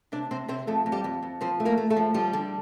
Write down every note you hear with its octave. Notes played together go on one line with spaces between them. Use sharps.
C3 D4 D5
C3 C4 C5
C3 C4 C5
F2 A3 A4
F2
G3 G4
F2
F2
F3 C4 C5
A3
A#3 A#4
A3
A3 A4
F3
F3 G3 G4
D3